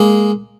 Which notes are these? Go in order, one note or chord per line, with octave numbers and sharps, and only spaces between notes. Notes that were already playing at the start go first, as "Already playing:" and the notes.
Already playing: G#3 A#3